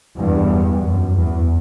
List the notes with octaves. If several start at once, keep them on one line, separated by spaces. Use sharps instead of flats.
E2 G2
F#2
E2